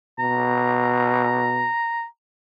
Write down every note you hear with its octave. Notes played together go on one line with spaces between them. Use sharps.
B2 A#5